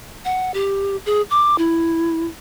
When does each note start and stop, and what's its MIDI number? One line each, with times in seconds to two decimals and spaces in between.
0.25 0.51 78
0.54 0.97 67
1.06 1.22 68
1.30 1.56 86
1.58 2.27 64